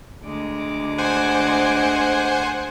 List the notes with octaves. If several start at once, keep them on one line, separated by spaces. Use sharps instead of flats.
D2 G#3 D6
C5 F#5 G#5